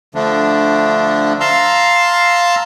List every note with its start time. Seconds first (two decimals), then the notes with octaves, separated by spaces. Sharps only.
0.15 D3 F3 A3 D4
1.40 F5 A5 A#5 C6 E6